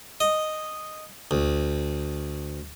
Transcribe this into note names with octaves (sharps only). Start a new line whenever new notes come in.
D#5
D2